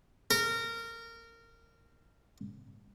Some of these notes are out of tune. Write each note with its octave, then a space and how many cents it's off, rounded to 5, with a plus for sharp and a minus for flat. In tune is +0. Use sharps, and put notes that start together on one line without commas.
A#4 -20